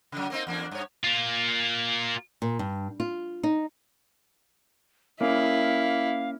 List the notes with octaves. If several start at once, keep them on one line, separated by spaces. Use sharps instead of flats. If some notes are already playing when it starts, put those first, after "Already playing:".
C#3 F#3
A#3 C4 D#4
E2 A#3 D4
G2 C#5
A#3 F4
A#2
G2
F4
D#4
A#3 C#4 E4 F5